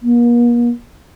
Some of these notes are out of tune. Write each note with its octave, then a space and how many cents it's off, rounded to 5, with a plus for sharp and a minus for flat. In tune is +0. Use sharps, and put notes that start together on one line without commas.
A#3 +40